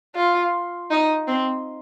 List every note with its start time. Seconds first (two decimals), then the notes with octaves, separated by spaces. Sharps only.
0.16 F4
0.91 D#4
1.28 C4